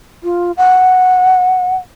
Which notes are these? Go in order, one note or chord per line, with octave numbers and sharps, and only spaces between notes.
F4
F#5